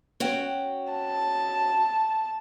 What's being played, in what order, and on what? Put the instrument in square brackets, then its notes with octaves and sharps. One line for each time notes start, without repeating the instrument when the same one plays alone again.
[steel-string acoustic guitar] C#4 F#4 G5
[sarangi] A5